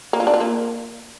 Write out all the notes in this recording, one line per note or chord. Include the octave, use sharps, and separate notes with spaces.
A#3
F4
D4
F4
A#3